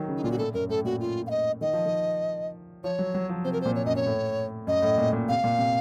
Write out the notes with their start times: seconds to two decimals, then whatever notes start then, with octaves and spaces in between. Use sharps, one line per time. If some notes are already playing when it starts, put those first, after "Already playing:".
Already playing: D#3 F#3
0.08 C#3
0.17 D#4
0.24 A#2 F4
0.31 F#4
0.38 A2 A4
0.54 F#2 A#4
0.69 A2 A4
0.85 A#2 F#4
1.00 F4
1.27 F5
1.31 D#5
1.61 D#3 D#5
1.73 F3
1.86 D#3
2.84 F3 C#5
2.99 F#3
3.14 F#3
3.29 F3
3.45 C3 C5
3.53 A#4
3.61 A#2 C5
3.76 C#5
3.86 F#2 D#5
3.96 C#5
4.06 A2
4.67 F#2 D#5
4.82 A2
4.98 A#2
5.13 A#2
5.28 C3 F5
5.44 A#2
5.59 C3